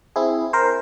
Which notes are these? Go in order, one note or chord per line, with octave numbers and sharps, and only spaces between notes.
C4 E4 G#4
A#4 C5